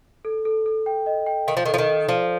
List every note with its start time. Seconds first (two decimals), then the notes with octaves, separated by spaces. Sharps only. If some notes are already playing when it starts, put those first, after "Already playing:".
0.25 A4
0.45 A4
0.66 A4
0.86 G5
1.06 D#5
1.27 G5
1.47 D#3 F5
1.57 F3
1.65 D#3 A4
1.74 F3
1.78 D#3
1.89 A4
2.08 F3 D5